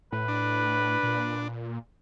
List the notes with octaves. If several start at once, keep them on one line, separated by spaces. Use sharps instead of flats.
A2 B4
D4
A#2